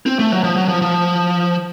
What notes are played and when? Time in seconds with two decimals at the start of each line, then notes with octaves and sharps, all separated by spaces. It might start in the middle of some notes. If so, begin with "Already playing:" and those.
0.06 C4
0.19 A3
0.32 F#3
0.43 F3
0.56 F#3
0.68 F3
0.82 F3